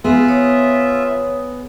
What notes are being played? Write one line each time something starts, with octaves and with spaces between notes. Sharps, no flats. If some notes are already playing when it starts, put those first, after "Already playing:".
B3 F4 G#4 E5
C#5 D#6